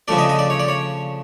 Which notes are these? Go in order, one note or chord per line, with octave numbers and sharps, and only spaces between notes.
C#3 F3 A3 D4 D5
D#5
D#5
D5
C#5
D5
C#5